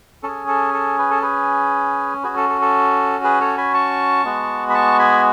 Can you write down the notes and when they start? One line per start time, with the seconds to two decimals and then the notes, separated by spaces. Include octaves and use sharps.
0.23 C#4 G#4 A4
0.48 A4
0.74 A4
0.99 B4
1.11 A4
1.22 G#4 B4
2.23 C#4 F#4 G#4 B4
2.37 A4
2.49 A4
2.61 A4
3.24 G#4 B4
3.41 A4 C#5
3.58 G#5 B5
3.74 A5 C#6
4.25 G#3 B3 F#4
4.70 B5
4.74 A5 C#6
4.99 G#5 B5